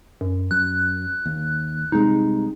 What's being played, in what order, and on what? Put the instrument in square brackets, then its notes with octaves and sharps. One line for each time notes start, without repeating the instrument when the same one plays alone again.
[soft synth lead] F#2
[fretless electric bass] F#2 [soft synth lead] F#6
[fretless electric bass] D#2
[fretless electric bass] C2 C3 G#3 [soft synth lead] D#4